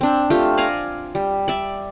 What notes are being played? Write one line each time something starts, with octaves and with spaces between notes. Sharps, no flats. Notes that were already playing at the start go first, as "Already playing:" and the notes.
C4 D4
A3 F4 G4
D5 F5 G#5 A#5
G3
D5 E5